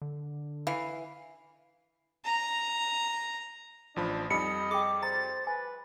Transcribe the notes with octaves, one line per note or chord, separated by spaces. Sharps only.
D3
E3 F5
A#5
A1 F3 D4 B5
F2 G3 D#4 G4 D#5 B5 C#7
G#4 G5 D6
C5 A#5 A6
B4 G#5